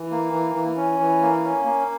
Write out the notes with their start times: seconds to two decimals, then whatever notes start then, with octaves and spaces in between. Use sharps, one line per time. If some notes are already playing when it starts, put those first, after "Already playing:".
Already playing: E3
0.11 A#3
0.33 E3
0.55 E3
0.77 C#4
0.99 E3
1.22 A#3
1.44 C#4
1.65 A#3